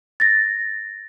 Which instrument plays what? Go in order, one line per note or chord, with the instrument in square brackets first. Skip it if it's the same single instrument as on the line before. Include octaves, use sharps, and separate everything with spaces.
[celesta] A6 A#6